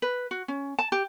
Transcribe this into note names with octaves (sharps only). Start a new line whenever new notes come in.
B4
F#4
C#4
A5
G4